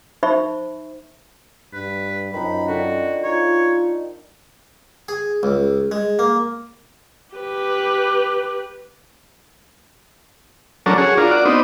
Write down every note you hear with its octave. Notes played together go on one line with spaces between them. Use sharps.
D#4 C5 E5 B5 C#6
G2 B4
F#2 D#3 F3 D#4 B5
D3 D#3 F4 F#4
D#4 F4 C#5
G#4
C#2
G#3
A#3
G4 B4
F#3 C#4 D4 A4 A#4
F#4 G#4 C#5
D4 F4 A#4
F#4 D5
B3 C4 D4 D#4